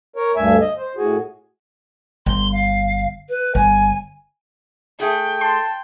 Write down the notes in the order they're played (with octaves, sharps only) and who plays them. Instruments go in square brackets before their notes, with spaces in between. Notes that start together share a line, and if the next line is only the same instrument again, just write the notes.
[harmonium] A#4 C#5
D2 G2 E5 G#5
D#5
C5
A2 F#4 G#4
[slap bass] G1 [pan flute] C6
[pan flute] F5
B4
[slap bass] G1 [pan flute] G#5
[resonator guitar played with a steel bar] A3 G#4 [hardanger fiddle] G5
[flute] A5 [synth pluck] C6